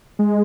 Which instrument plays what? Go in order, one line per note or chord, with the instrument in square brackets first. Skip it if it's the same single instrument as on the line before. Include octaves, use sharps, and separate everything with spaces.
[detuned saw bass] G#3